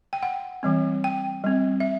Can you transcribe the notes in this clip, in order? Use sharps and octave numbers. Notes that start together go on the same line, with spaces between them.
G5
F#5
E3 G3 C4
G5
G3 C4
E5